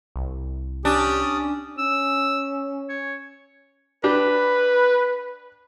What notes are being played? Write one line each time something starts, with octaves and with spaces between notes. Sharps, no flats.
C2
C#4 D4 G4 D#6
C#4 E6
C#5
D4 G4 B4